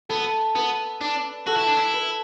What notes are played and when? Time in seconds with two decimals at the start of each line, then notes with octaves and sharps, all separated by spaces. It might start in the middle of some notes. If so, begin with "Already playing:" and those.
0.09 B3 A4
0.55 B3 B4
1.01 D4
1.47 F#4 A4
1.57 E4
1.67 D4
1.77 E4
1.94 B4